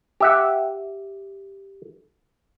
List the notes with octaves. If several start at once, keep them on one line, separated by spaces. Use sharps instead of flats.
G4 E5 F#5